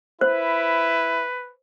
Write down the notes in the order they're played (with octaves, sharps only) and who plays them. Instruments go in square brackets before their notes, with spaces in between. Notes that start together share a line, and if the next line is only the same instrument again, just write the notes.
[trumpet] E4 [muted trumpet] B4 [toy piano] C5